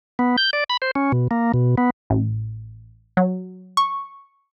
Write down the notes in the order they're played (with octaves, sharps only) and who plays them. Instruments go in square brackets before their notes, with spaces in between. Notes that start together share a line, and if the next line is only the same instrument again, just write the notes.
[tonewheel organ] B3
G6
D5
B5
C5
C#4
B2
A#3
B2
B3
[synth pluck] A1
F#3
C#6